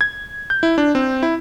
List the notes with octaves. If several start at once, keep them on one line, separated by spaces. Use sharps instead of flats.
G#6
G6
E4
D4
C4
E4